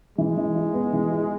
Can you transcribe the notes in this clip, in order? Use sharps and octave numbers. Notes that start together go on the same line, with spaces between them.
E3 G#3
E3
E4
B3
E3
E4